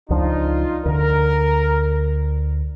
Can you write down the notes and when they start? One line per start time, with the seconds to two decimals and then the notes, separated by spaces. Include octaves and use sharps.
0.10 C#2 F3 D4 D#4 F4
0.85 D2 D3 A#4